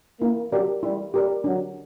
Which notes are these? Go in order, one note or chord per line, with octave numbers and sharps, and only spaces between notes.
A#3 E4
F#3 G4 A#4 D5
G3 E4
G3 G4 A#4 D5
F#3 D4